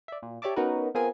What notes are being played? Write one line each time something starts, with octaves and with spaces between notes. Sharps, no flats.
D5 E5
A#2
G4 C#5 D5 E5 A5 D6
B3 C#4 D#4 F#4 A#4 B4
B3 C4 F4 G#4 A#4 G#5